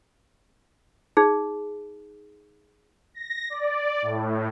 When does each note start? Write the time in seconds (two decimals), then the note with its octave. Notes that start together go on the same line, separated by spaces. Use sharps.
1.17 D#4 G#4
3.14 A#6
3.50 D5
4.02 A2